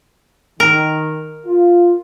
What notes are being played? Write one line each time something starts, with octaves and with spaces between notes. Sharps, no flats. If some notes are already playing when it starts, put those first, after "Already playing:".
D#3 A#4
F4